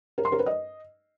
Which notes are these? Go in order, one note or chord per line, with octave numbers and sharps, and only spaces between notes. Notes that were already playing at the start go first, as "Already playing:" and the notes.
A#4
C6
A#4
B4
D#5